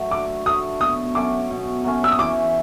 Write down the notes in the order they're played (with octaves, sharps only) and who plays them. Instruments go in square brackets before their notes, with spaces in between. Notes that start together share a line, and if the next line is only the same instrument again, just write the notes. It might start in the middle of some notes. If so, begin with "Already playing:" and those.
Already playing: [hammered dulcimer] F#3 A3
[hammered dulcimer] D3 [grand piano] D6
[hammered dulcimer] F#3 A3 [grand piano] D#6
[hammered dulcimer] B2 [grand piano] D#6
[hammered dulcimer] F#3 A3 C#4 [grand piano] D6
[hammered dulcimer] B2
F#3 A3 C#4
[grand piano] E6
D#6
[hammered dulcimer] E3 [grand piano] D6